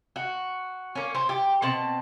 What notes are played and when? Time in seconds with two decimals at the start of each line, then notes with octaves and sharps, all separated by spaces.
0.16 F#4
0.95 A#3 C#4
1.15 C4
1.29 G4
1.62 B2 C4 A5